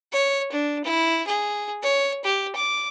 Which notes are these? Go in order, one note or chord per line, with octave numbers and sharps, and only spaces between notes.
C#5
D4
E4
G#4
C#5
G4
D6